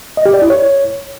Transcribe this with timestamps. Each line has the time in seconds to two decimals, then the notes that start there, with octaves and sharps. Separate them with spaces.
0.17 D#5
0.26 G4
0.34 D5
0.42 E4
0.50 C#5